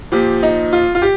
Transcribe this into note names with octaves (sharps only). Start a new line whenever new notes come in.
A#2 F3 G4
D#4
F4
F4
G4